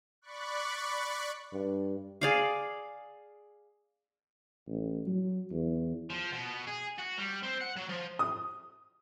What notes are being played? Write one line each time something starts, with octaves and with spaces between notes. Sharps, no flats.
D5 B5 C#6 F#6
G2
G#4 D5 F5
A1
F#3
E2
F3
B2
G#4
F#4
G3
C4
F#5
F#3
F3
D#6